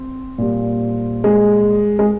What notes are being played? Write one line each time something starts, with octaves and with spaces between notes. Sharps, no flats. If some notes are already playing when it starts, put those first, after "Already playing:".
Already playing: C4
A#2 G3
G#3
G#3